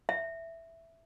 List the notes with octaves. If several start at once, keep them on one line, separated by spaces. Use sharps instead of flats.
E5